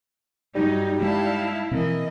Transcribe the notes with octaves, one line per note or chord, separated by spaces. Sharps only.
G2 F#3 G3 D#4
G#3 D#4 E4 F5 A5
B2 E3 A#3 C4 D#5